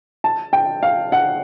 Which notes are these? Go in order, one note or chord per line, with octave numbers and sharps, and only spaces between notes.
A5
G5
F5
F#5